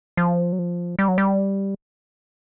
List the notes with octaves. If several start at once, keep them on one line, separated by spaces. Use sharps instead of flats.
F3
F#3
F3
G3
F#3
G3